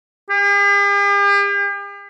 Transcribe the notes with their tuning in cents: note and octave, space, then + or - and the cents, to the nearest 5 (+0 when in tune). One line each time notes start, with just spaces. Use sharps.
G4 +45